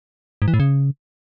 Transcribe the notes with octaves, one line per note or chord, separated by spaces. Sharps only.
G#2
E3
A2
C#3